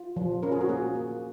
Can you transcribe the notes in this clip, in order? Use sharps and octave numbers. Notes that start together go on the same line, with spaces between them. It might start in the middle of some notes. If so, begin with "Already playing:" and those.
Already playing: F4
F3
C#4 A#4
G#4
F#4
A#3 G#4
A#3